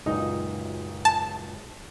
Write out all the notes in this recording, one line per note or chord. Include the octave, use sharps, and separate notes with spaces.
C#2 F#2 A#2 D#4
A5